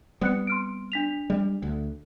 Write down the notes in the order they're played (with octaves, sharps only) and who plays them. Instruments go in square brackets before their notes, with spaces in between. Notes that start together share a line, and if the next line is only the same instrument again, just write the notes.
[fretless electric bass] G3 B3 C4 [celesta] D#6 F#6 C#7
[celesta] C6 F6 D7
D4 B6 F7
[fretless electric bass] G3
D2